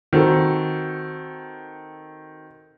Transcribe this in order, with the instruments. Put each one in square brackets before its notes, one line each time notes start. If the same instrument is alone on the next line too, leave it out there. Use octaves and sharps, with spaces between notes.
[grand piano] D#3 C4 F#4 A4